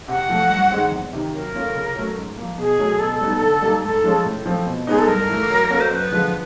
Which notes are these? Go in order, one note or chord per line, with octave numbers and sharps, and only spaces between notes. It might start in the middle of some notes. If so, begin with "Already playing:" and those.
C3 F#5
F3 A3
G2
D#3 G#3 C4
E2
C3 D#3
F#3 A#4
A#3 C#4 F4 A4
C#3
F#3 A3 C#4
G#2
F3 A#3
B2 G#4
F#3 A3
B2 A4
G3 B3 D#4
D3
G3 A#3 D#4
G#2 A4
F3 G#3 C#4
A2
F3 A3 C4
B2
G#3 B3 D#4 G#4
A4
G2 A#4
E3 A3
F#3
A#3 C#4 F#4 A4
C5
F#2 B4 C5
D3 F3 G#3